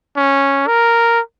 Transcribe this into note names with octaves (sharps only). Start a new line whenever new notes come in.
C#4
A#4